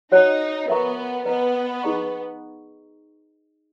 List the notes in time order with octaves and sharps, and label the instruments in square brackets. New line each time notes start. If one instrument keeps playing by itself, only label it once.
[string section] D#4 [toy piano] F#4 C#5 F#5
[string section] B3 [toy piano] A#4 E5 A#5 C#6
[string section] B3 [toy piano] B4 D#5 A#5
[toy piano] D#4 G#4 D#5 A#5 C#6